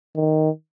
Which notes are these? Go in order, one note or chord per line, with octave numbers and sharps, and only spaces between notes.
D#3